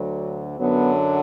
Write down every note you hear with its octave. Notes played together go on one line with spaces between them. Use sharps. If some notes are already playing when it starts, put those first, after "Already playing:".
Already playing: D2 D3 F#3
F#2 D3 F#3 B3